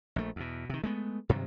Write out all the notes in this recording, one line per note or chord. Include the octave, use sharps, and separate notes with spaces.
A#1 A3
E2 B2
C3 D#3
G#3 A3 B3
G2 C3 D#3 F#3